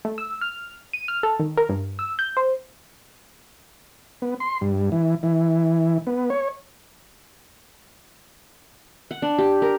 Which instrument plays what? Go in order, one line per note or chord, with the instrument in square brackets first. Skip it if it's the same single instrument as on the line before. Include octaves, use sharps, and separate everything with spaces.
[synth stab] A3
E6
F6
D#7
F6
A4
D#3
A#4
G2
E6
G6
C5
[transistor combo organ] B3
C6
G2
E3
E3
B3
C#5
[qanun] F#5
D4
G4
A#4